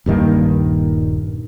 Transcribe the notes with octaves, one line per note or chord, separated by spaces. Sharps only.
D#1 G2 D#3 A#3